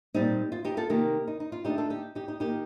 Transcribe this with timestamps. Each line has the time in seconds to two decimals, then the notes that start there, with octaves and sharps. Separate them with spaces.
0.14 A#2 G3 C4 D#4 G4
0.52 F4
0.65 D#4 G4
0.77 F4 A4
0.90 C3 D#3 A#3 D#4 G4 A#4
1.28 D#4
1.40 D#4
1.52 F4
1.65 D3 A3 D4 D#4 G4
1.78 F4 A4
1.90 D#4 G4
2.15 D#4 G4
2.28 D#4 G4
2.40 D#3 A#3 D#4 G4